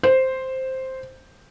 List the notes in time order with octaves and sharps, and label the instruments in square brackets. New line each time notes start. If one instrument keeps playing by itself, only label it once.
[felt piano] C5